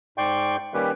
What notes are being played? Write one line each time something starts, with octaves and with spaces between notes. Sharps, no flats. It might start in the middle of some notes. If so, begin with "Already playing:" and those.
G#2 D5 G5 C6 C#6
D#3 G3 A#3 C#4 G4 B4